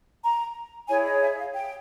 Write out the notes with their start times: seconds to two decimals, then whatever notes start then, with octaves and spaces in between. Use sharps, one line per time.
0.23 A#5
0.89 E4 G#4 C#5 G#5
1.05 D#5
1.21 E5
1.37 F5
1.54 G5